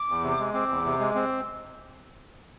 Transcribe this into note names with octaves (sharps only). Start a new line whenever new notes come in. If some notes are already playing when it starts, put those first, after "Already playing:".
Already playing: D6
E2
C3
G#3
C4 D6
E2
C3
G#3
C4